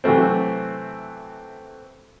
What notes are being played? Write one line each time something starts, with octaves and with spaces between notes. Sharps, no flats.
C3 E3 F#3 A3 C4